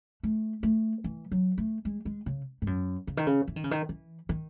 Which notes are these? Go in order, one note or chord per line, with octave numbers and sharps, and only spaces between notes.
A3
A3
E3
F#3
A3
G#3
G#3
C#3
G#2
F#2
C#3
D#3
C#3
E3
D#3
C#3
D#3
E3
D#3